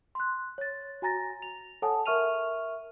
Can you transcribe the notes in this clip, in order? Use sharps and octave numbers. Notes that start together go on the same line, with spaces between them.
C6 F#6
C#5 A6
F#4 G#5 A#5 A6 A#6
F7
A4 C#5 F#5 G#5 A5 D#6
A#4 E5 C#6 F6 D#7 F7